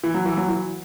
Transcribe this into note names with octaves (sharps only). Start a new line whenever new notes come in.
E3
F#3
E3
F#3
E3